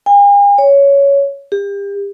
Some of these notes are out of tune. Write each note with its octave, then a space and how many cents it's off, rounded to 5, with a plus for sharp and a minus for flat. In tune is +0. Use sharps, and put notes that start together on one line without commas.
G#5 -45
C#5 +10
G4 +35